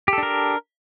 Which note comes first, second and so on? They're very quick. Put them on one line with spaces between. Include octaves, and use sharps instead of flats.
G4 A4 D4 A#4